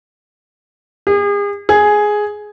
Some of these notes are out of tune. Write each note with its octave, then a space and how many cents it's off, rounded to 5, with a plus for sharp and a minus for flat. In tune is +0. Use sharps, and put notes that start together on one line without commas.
G#4 -40
G#4 +5